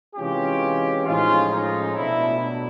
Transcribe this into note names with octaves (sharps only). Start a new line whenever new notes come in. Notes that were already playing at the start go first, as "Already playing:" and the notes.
C3 E3 G#3 C#4 F4 G4
A2 F3 G#3 C#4 D#4 F4
C#4 D#4
B2 F#3 A3 D4 E4
D4 E4